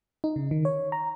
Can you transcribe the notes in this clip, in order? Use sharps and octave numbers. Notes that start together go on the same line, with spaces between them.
D#4
C#3
D#3
C#5
A#5